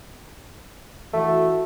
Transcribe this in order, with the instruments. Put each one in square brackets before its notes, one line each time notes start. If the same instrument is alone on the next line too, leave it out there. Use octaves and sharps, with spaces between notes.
[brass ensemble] E3 F#4 [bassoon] A3